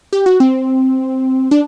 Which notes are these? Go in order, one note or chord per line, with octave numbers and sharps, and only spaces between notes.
G4
F#4
C4
D4